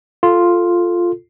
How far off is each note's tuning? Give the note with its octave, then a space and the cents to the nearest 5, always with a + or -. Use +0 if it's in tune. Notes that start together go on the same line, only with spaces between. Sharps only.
F4 +0 A4 +0